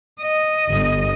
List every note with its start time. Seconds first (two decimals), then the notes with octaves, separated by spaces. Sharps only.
0.21 D#5
0.69 G1